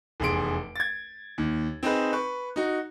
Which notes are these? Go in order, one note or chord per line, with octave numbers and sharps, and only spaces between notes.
F1 E2 G#4 C6 D7
G#6 A6
D#2
C4 D#4 G#4 B4
B4 C#6
D#4 F#4